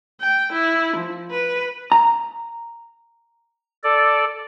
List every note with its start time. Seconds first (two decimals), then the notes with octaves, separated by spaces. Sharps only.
0.21 G5
0.53 E4
0.97 F3
1.31 B4
1.92 A#5
3.84 A4 D5